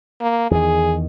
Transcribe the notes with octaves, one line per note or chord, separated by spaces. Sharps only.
A#3
E2 D#3 G#4